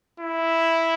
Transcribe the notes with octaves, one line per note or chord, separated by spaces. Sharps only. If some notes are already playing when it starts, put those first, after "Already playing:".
E4